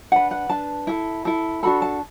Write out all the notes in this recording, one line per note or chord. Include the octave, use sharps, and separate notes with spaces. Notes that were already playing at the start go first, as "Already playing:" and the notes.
D4 B4 F#5
F#5
D4 B4 A5
E4 A4
E4 A4
D4 F#4 A4 B5
A5